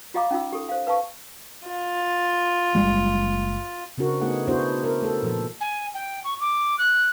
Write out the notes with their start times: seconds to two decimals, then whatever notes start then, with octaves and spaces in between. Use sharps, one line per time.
0.14 F4 G4 D#5 F5 A#5 D6
0.31 C#4 D#4 F4 E6
0.53 G4 A4
0.69 C5 F5
0.87 B4 F5 A5 C#6
1.67 F4
2.75 F#1 G3 G#3
3.98 C#3 C4 D4 F#4 A#4
4.21 A3 B3 D#4 G#4 F#5
4.48 B3 D4 E4 F#4 G#4 C5
4.84 A#4 C5
5.02 A3 A4
5.23 A#2 F3 A4
5.61 G#5
5.94 G5
6.24 C#6
6.40 D6
6.79 F#6